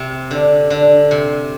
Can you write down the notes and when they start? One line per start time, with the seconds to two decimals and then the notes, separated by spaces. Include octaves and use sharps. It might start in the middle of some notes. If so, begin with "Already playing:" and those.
Already playing: C3
0.31 D3
0.70 D3
1.11 C3